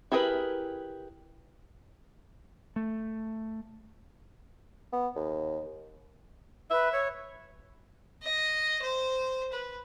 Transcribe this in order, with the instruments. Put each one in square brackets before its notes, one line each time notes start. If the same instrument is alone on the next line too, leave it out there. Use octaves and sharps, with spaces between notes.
[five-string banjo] E4 G4 G#4 A#4 B4
[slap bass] A3
[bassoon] B3
D#2
[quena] B4 [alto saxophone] E5
[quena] C#5
[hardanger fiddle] D#5
C5
B4